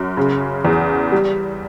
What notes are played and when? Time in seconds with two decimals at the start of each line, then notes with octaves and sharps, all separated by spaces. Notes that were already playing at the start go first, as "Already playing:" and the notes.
Already playing: F#2
0.17 C#3
0.65 E2
1.12 G3